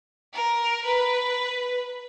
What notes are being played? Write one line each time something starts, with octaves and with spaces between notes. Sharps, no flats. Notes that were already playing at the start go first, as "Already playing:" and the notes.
A#4
B4